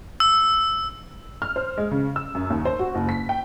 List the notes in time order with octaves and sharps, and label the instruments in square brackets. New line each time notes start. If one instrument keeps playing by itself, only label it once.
[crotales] E6
[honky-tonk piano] F6
C5
G#3
C#3
E6
F#2
D#2
C5
F#4
F#1
B6
G5